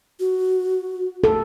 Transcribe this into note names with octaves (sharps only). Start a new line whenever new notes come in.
F#4
A4